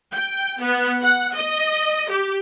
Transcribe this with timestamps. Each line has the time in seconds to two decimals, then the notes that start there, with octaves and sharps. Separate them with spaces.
0.13 G5
0.62 B3
1.02 F#5
1.35 D#5
2.10 G4